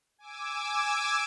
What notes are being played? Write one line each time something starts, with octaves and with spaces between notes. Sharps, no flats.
G#5 D6 E6